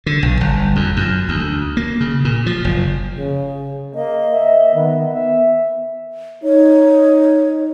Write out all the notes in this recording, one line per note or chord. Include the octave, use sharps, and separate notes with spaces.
D3
B1
G1
F2
F#2
D2
A#3
C#3
A#2
F3
F#1
C#3
A#3 D#5
E5
D#3 B3
B3 E5
D#4 C#5